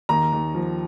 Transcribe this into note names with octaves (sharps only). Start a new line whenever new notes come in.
D#2 A#5
D#2
F3